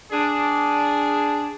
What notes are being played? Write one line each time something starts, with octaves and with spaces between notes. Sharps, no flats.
D4 G#4